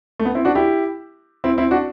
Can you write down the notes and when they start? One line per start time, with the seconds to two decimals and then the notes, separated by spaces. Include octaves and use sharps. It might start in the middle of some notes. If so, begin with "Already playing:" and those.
0.19 A3
0.25 B3
0.35 C4 E4
0.45 D4 F#4
0.55 E4 G4
1.44 C4 E4
1.58 C4 E4
1.71 D4 F#4